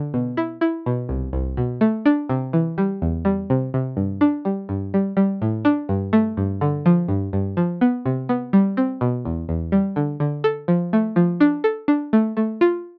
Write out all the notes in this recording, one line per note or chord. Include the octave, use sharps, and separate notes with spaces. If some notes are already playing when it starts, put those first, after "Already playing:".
Already playing: D3
B2
E4
E4
B2
C2
C2
B2
A3
D4
C3
E3
G3
E2
G3
C3
C3
G2
D4
G3
G2
G3
G3
A2
D4
G2
A3
G2
D3
F3
G2
G2
F3
B3
C3
B3
G3
C4
B2
E2
E2
G3
D3
D3
A4
F3
A3
F3
D4
A4
D4
A3
A3
F4